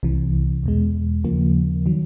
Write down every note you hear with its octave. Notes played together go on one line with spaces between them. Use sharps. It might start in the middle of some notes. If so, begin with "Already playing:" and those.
C2 C3 E3
E2 B2 G#3
D#2 C#3 F3 A#3
D#3 F#3